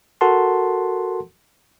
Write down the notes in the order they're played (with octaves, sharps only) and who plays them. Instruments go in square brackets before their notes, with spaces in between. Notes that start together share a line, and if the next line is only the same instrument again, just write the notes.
[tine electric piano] F#4 A4 A#4 F#5 A5 C6